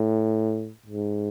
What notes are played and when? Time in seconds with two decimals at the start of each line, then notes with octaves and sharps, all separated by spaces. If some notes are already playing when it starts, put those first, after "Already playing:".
Already playing: A2
0.86 G#2